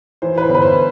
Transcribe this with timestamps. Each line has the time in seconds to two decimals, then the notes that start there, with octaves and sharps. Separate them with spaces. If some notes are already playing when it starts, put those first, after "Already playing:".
0.22 E3 C5
0.38 B4
0.43 C5
0.49 G1
0.55 B4
0.62 C5